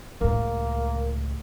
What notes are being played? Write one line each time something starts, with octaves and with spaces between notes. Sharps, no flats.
C#2 A2 A#3